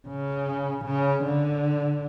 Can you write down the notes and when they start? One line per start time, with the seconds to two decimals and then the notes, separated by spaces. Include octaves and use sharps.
0.08 C#3
0.85 C#3
1.24 D3